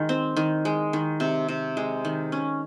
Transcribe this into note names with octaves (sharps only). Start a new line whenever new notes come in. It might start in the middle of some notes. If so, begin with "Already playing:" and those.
Already playing: D#3 G#3
C4
D#3
G#3
D#3
C3
C3
G#3
D#3
C#4